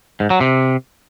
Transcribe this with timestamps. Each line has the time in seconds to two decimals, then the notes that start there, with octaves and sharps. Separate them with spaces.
0.20 G#2
0.30 F#3
0.40 C3